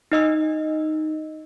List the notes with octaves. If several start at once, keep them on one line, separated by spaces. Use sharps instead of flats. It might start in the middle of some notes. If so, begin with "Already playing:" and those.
D#4 D#5 E6